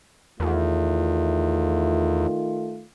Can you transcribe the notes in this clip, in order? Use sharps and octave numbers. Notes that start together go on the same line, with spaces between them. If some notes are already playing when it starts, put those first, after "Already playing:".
E2 D#3 A3 F4